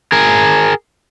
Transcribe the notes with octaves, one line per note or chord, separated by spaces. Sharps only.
G#4 A#4